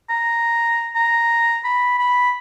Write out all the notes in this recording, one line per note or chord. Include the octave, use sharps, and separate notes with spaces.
A#5
A#5
B5
B5